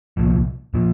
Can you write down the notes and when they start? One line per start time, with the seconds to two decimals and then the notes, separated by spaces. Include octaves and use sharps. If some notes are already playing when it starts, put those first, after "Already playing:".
0.17 C2 A#2 F3
0.74 A#2 F3